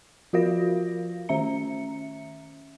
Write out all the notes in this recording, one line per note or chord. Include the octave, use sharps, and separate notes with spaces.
F3 F4 F#4 A#4 F5 A#6
D#3 C#4 E5 A#5 C#7